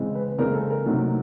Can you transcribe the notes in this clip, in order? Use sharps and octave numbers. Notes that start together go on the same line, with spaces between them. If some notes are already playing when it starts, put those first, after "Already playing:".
Already playing: C#3 E3 G#3 C4
B4
C#3 E3 G#3 C4 A#4
A4
A#4
C3 D#3 F#3 A3